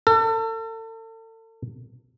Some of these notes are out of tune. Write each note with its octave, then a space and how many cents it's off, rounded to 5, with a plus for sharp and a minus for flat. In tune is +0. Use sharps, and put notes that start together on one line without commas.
A4 +35